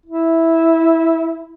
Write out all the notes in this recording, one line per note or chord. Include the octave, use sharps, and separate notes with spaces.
E4